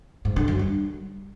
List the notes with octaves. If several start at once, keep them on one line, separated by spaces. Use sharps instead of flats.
G#2
D3
F#2
G3